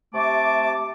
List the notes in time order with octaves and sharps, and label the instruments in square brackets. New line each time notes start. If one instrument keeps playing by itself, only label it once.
[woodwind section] C3 A3 A5 D6